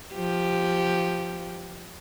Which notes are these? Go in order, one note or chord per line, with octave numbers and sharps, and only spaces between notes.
F3 G4